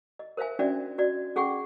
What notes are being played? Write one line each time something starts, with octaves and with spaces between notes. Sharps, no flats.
D#5
A#4 C5 E5 F5 G#5
C#4 D4 F#4 D5 E5
F#4 D5 D#5
C#4 G#4 F#5 G5 C#6